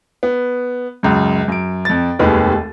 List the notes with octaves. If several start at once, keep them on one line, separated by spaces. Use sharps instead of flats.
B3
C#2 F#2
F#2 D7
F2 A6
F1 D#2 D#3 G#3 B4